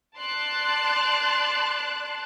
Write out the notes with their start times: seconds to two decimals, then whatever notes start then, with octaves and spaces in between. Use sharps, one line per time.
0.16 D5 A5 C6 F#6